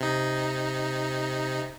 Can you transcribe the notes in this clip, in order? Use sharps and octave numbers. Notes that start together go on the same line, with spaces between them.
C3 D#4